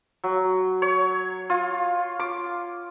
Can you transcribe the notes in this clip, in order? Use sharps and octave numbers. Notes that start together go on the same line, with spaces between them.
F#3
C#5
F4
D6